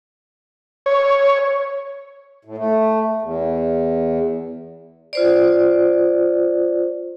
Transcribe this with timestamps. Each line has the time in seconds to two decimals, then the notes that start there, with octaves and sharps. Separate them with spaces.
0.86 C#5
2.45 A2
2.58 A3
3.22 E2
5.13 F4 C5 D5